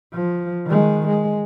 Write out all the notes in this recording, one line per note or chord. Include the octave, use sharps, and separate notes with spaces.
F3
D#3 G#3
G#3